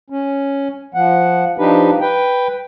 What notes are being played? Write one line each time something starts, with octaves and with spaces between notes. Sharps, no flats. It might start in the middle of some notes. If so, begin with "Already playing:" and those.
C#4
F3 F#5
F3 D4 D#4 G4 B4
B4 G5